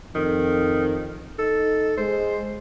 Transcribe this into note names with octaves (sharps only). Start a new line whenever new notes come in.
F2 D#3
D#4 A4
G#3 C5